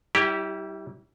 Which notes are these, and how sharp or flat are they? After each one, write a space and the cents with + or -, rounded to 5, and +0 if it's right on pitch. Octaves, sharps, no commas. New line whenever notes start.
G3 -40 E4 -25 G4 +0